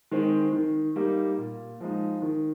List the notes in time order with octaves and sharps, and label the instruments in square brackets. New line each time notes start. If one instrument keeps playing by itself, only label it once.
[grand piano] D#3 G#3 C4
D#3
G3 A#3 D#4
A#2
F3 G#3 D#4
D#3